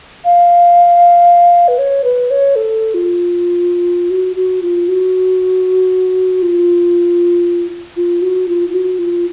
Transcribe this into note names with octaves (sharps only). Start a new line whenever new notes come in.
F5
B4
C#5
B4
C#5
A4
F4
F#4
F#4
F4
F#4
F4
F4
F#4
F4
F4
F#4
F4